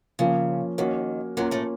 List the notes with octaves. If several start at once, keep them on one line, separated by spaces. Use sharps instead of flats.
C#3 F3 A#3 C#4 F4
D#2 D#3 A#3 C#4 F#4 A#4 C#5
F#2 F#3 A#3 C#4 F4
A2 A3